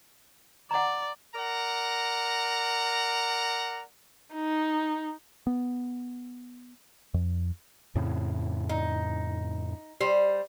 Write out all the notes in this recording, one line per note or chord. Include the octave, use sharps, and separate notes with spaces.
D5 F#5 A#5
A#4 D5 F#5 A#5
D#4
B3
F2
F2 A2 C#3
D#4
G3 C5